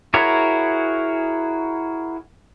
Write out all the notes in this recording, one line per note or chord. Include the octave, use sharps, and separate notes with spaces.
E4 F#4 G#4 A#4 C#5